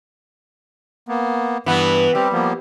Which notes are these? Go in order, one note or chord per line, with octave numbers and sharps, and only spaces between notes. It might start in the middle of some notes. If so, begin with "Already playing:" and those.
A#3 B3
G2 E3 B3
G3 C4 G4
F3 A#3 B3